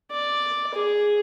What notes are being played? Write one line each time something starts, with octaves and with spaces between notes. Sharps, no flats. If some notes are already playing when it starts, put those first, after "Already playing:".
D5
G#4